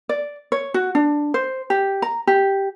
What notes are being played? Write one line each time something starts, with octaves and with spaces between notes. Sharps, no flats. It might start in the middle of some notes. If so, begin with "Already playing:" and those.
D5
C#5
F#4
D4
C5
G4
A#5
G4